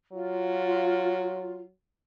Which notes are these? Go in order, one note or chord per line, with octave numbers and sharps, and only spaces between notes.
F#3 F4